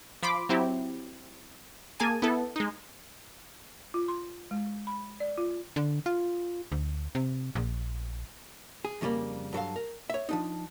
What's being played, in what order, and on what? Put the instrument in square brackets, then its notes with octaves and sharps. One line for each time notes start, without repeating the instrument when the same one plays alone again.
[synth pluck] F3 B5 C6 D6
F#3 C4 E4 G4
A#3 G#4 G#5 A5 D#7
B3 E4 A4
G#3 D#4
[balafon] F4
C6
G#3
B5
D5
F4
[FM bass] D3
F4
D2
C3
A#1
[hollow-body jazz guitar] G#4
F2 C#3 G3 A3 A#3
G2 F#3 A4 F5
A#4
C#5 E5
F3 D4 D#4